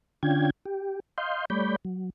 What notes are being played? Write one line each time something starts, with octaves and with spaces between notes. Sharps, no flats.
D3 C#4 D4 F4 G5 G#6
G4
D#5 F5 C6 G6
G3 A3 C#5 D5 B5 G6
F#3